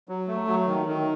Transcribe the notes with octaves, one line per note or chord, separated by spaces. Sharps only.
F#3
A3
F#3
D#3
D#3